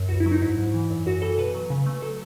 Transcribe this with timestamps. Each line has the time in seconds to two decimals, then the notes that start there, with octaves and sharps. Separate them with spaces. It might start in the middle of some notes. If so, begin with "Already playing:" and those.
Already playing: F#2
0.09 C#2 F#4
0.20 E4
0.26 F#3
0.32 D#4
0.42 G#2 E4
0.58 G#2
0.74 E3
0.90 F#2
1.06 F#2 F#4
1.22 E3 A4
1.38 B2 B4
1.55 F#3
1.70 C#3
1.86 A3
2.02 F#3 A4